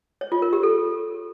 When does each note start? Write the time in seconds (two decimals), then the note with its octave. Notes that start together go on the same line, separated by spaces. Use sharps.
0.21 C#5
0.32 F4
0.42 A#4
0.53 G4
0.63 A4